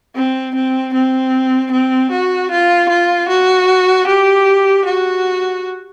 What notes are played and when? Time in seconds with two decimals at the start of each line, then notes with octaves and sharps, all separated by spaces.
0.16 C4
0.55 C4
0.94 C4
1.72 C4
2.11 F#4
2.51 F4
2.89 F4
3.29 F#4
4.08 G4
4.85 F#4